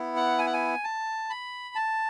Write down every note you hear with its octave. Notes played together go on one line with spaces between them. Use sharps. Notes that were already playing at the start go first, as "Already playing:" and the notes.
Already playing: B3 E4
F#5
G#5
F#5
G#5
A5
B5
A5